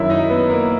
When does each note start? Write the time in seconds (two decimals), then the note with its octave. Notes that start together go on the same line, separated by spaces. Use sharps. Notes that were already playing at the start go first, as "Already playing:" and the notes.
Already playing: F#2 D#3 F#3 E4 E5
0.10 D#4 D#5
0.29 B3 B4
0.50 A#3 A#4